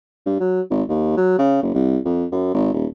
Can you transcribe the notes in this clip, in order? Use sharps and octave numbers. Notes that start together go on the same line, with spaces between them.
G2
F#3
G#1
D#2
F#3
C#3
F#1
C2
F2
F#2
G#1
D#1